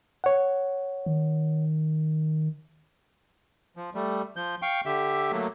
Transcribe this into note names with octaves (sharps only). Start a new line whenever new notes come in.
C#5 F#5
D#3
F3
G3 A3
F3 G6
F5 G5 C#6
D3 G4 E5
F#3 A3 A#3